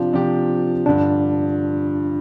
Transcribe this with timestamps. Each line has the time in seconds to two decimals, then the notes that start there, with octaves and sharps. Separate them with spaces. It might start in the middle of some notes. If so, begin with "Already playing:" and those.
Already playing: C3 F3 D4 F4 G4
0.13 C3 F3 D4 G4
0.86 G2 D3 F3 D4